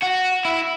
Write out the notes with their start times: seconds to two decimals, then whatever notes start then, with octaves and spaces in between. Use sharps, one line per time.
0.03 F#4
0.45 E4